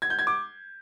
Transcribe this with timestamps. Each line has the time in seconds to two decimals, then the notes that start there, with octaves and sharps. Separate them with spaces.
0.02 G#6
0.10 G6
0.19 G#6
0.27 D6